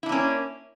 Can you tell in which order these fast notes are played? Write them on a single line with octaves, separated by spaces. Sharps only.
E4 D4 A#3 C#4